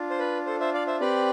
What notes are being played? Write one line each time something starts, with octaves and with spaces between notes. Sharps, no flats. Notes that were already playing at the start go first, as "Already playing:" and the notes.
Already playing: D4 F4
C5
B4
A4 C5
C5 E5
D5 F5
C5 E5
C4 G4 B4 D5